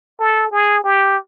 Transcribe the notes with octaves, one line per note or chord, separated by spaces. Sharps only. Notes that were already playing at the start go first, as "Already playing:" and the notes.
A4
G#4
G4